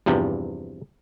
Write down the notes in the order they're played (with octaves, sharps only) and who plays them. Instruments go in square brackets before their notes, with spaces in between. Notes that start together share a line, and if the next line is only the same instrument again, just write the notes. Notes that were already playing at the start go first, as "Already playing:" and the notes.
[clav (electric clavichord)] E2 G2 C3 F3